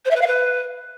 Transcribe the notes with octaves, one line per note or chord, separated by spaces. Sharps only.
C5
E5
B4
F5
B4